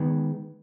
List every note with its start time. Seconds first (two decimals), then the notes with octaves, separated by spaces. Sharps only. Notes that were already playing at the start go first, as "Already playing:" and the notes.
Already playing: D#3 G#3 B3